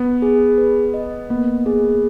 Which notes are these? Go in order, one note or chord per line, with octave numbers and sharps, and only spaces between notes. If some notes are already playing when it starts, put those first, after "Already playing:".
Already playing: B3
G#4
B4
D#5
A#3 B3
G#4